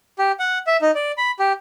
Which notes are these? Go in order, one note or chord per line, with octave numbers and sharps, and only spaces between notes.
G4
F#5
E5
D#4
D5
B5
G4